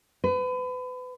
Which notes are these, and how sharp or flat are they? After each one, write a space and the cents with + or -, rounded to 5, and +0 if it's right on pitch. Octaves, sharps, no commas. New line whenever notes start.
B4 +35